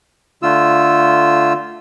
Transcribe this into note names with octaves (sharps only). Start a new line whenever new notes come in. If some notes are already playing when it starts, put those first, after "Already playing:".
D3 A3 F4 E6